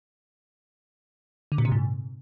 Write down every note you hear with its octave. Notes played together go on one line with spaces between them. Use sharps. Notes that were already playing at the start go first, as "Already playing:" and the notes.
D3
A#2
C3
G#2